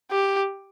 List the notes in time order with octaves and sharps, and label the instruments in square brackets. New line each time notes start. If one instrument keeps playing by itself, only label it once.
[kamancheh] G4